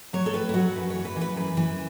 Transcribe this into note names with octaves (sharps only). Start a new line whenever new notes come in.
F#3 C#5
A4
A2 B4
E4
F#3 F#4
F#2 B4
E3 C#5
B4
E3
B4
F#2 B4
E3